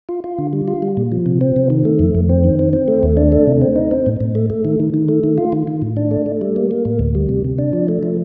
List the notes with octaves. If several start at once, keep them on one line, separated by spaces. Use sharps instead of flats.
F4
F4
D3
G3
F4
G3
A#2
F3
C3
C4
C3
D#3
A3
F2
F2
C4
D#3
C4
C4
A3
D#2
D4
A3
C3
C4
D#4
C4
A2
A2
A3
A3
D#3
D#3
D#3
A3
D#3
F4
D#3
D#3
A2
D4
A3
A3
G3
A#3
A#3
A2
D2
G3
C3
C3
D4
F3
A3
F3